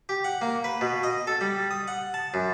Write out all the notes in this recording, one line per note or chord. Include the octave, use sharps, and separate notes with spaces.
G4
F#5
A#3
B4
B2
D#5
A4
G3
D#6
F#5
A5
F#2